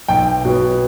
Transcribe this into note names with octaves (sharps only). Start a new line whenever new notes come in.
B1 G5
B2 F#3 B3